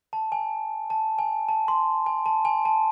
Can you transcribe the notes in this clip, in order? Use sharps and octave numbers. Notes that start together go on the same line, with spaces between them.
A5
G#5
A5
G#5
A5
C6
G#5
A5
G#5
A5